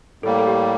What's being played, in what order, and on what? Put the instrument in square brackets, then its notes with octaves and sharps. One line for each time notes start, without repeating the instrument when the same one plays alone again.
[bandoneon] A2 G3 A#3 [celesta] A4
[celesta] A4
G4